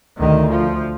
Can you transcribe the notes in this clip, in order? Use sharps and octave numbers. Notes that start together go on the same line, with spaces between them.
D2 D#3
F3